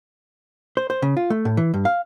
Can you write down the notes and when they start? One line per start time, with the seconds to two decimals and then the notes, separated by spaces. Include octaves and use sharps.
0.77 C5
0.90 C5
1.02 C#3
1.17 F4
1.30 A3
1.45 A2
1.57 E3
1.74 G2
1.85 F5